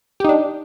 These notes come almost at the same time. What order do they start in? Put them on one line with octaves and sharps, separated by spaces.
G4 D#4 D4